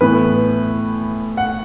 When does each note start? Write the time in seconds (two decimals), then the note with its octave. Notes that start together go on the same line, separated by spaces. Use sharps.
0.01 A2 E3 B3 B4
1.37 F#5